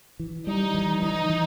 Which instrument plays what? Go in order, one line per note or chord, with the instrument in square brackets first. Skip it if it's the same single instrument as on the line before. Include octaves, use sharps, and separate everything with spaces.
[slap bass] E3
[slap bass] G3 [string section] D#4
[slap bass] E3
[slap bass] E3 [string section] D#4
[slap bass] E3